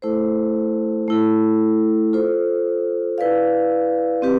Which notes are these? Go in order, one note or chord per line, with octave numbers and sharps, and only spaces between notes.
A3 E4 A4 C5
A3 E4 A4
F4 A4 C5
E4 B4 D5 F5
C4 G4 B4